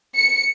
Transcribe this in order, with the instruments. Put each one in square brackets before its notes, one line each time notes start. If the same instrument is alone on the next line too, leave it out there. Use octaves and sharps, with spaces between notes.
[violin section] C#7